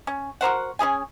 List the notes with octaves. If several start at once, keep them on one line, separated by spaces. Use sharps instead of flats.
C#4
F#4 A#4 C5 F#5
C#4 E4 G#4 G#5